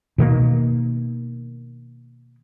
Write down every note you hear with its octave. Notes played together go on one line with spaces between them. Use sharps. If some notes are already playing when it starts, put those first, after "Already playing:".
B2 D#3 A#3